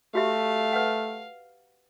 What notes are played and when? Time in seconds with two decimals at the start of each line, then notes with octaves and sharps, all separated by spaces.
0.15 A3 F#4 G4 E5 F5
0.73 B4 F#5